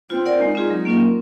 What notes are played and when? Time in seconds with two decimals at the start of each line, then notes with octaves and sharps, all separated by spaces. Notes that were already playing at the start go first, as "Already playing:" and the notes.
0.10 C4 F4
0.25 A#4 D5 F#5
0.40 G#3 D#4
0.55 C4 F4 G#4
0.70 F#3
0.85 A#3 C#4 F4 A#4
1.00 C4